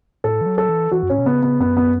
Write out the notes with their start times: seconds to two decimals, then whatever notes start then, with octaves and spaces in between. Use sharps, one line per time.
0.24 A2 A4
0.41 E3
0.46 F#3
0.58 A4
0.69 E3
0.91 E3 F#4
1.03 F#2
1.10 A2 C#4
1.18 B2
1.26 C#3 B3
1.43 B3
1.60 F#2 B3
1.77 B3